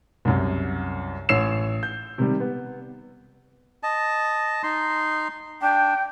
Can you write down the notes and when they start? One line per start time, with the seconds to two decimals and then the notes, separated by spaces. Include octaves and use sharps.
0.25 C2 F#2
1.29 A1 C#5 E6 C7 E7
1.83 G6
2.18 C3 D#3 G3
2.40 B3
3.83 D#5 A5
4.63 D#4 C6
5.62 D4 G5